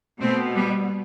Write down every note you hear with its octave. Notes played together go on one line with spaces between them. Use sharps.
B2 A3 C4
G3 B3